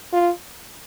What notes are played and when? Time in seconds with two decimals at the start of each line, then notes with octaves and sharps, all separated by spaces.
0.13 F4